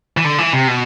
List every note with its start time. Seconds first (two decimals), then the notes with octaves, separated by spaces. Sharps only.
0.17 E3
0.24 D3
0.38 E3
0.53 C3
0.68 B2